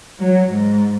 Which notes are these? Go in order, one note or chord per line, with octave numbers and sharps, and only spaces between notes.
F#3
G#2